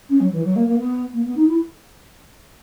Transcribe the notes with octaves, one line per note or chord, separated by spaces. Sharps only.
C#4
F#3
E3
F#3
A#3
A#3
B3
A#3
B3
D#4
E4